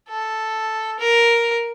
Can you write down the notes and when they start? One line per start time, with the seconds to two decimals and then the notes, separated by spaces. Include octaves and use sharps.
0.09 A4
0.99 A#4